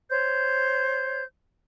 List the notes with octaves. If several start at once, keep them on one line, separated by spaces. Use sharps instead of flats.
C5 C#5 G6